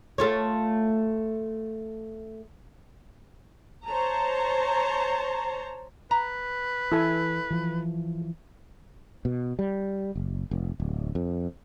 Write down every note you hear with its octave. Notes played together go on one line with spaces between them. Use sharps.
A3 F4 C#5
C5 C#5 A5 A#5
B4 A#5
E3 E4 A4 G#5
E3 F3
B2
G3
F#1
F1
D1
F2